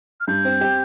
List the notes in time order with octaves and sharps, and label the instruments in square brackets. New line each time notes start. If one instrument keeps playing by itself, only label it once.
[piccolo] F6
[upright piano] G2 [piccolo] G6
[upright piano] C4
G4